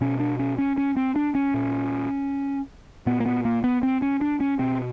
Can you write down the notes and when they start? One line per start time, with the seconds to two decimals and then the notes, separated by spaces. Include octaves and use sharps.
0.01 B2 C#4
0.20 D4
0.39 C#4
0.58 C#4
0.78 C#4
0.97 C4
1.16 D4
1.35 C#4
1.54 A#2
3.06 A#2 B3
3.20 A#3
3.26 B3
3.45 A#3
3.64 B3
3.83 C4
4.02 C#4
4.21 D4
4.40 C#4
4.59 B2 C4